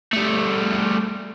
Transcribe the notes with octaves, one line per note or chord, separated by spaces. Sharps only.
G3 A3